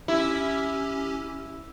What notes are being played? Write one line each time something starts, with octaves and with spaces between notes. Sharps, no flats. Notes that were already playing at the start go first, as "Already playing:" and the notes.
C#4 E4 G4